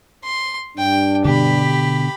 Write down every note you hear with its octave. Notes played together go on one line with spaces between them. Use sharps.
C6
G2 D4 G5
B2 D3 G4 B5